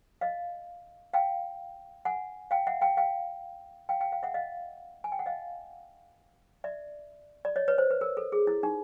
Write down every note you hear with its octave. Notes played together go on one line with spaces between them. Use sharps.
D#5 F5
F5 G5
F#5 G#5
F5 G5
E5 F#5
F5 G5
F5 G5
F5 G5
F5 G5
F5 G5
E5 F#5
D#5 F5
G#5
G5
F#5
D#5 F5
D5 E5
D5
C#5 D#5
B4 C#5
C5
B4
A#4
A4
G#4
E4
D#4